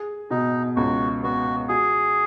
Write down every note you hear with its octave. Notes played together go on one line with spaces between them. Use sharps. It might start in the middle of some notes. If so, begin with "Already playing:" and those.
Already playing: G#4
B2 D#4
C#2 F#4
B3 F#4
F#4 G#4